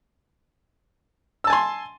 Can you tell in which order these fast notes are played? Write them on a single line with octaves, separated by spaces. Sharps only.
E6 A5 G#5 C6